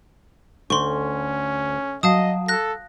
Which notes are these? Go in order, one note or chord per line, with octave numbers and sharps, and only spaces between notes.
D2 C#4 C6 C#6
F#3 D#5 F5 A5 D#6
A4 F#6 A#6